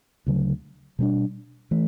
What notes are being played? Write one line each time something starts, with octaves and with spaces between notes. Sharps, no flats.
D2 C#3 F#3
B2 G3 B3 D4
E3 A3